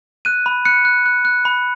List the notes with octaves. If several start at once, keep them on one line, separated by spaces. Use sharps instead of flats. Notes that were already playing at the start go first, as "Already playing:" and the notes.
F#6 D#7
B5
F#6 C#7
F#6
F#6
F#6
B5